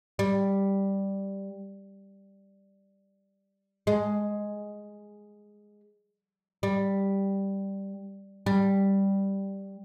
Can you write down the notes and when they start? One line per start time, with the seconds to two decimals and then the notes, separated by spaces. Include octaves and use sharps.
0.19 G3
3.87 G#3
6.63 G3
8.46 G3